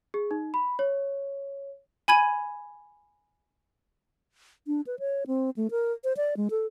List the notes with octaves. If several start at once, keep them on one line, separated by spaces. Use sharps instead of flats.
G#4
D#4
B5
C#5
G#5 B5 G#6 D#7
D4
B4
C#5
C4
A3
A#4
C5
D5
G#3
A4